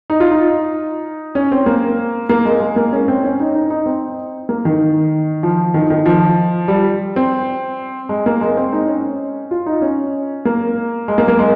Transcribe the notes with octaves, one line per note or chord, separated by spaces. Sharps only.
D#4
F4
D#4
C#4
C4
A#3
A#3
G#3
G#3
A#3
C#4
C4
C#4
D#4
D#4
D#4
C4
A#3
D#3
F3
D#3
D#3
F3
G3
C4
G#3
A#3
G#3
C4
D#4
C#4
F4
D#4
C#4
A#3
G#3
A#3
A#3
G#3